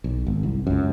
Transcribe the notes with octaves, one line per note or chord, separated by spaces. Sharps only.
B1
G#1
C2
C#2 F#2